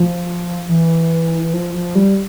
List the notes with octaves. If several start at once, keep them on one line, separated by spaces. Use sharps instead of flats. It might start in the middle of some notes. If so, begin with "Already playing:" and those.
Already playing: F3
E3
E3
F3
F3
G3